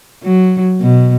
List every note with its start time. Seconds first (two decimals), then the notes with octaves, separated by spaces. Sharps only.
0.23 F#3
0.81 B2